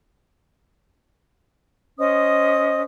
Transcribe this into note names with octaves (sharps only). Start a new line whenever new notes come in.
C#4 C5 D#5 D#6